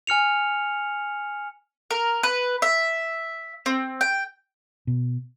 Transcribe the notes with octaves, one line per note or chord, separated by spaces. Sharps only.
G#5 F6 C#7 F7
A#4
B4
E5
C4
G5
B2